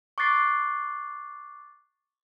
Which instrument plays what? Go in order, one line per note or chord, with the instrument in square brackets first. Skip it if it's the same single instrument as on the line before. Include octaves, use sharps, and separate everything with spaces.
[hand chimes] C#6 D6 F#6 A6 C7